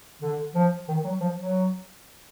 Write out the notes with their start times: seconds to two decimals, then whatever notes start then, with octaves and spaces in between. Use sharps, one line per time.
0.22 D3
0.55 F3
0.88 D#3
1.04 F#3
1.21 F3
1.37 F#3